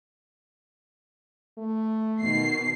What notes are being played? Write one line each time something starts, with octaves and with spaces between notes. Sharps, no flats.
A3
B2 D#3 C7